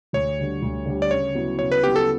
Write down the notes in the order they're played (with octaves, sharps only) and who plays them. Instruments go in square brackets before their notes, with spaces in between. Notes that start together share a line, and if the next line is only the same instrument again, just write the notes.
[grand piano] D2 [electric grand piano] C#5
[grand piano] D3 G3
D2
D3 G3
[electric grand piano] D5
[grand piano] C#3 [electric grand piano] C#5
[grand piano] F#3 B3 E4
[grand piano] C#3 [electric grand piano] C#5
[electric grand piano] B4
[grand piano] F#3 B3 E4 [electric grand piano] G4
[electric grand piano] A4